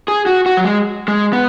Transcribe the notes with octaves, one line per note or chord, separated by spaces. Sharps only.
G#4
F#4
F#4
F#3
G#3
G#3
B3